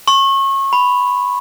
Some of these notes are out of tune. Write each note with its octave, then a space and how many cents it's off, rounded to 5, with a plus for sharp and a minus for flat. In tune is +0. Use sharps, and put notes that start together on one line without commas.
C#6 -30
B5 +5